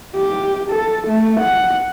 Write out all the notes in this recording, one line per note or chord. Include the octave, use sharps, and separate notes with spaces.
G4
A4
A3
F#5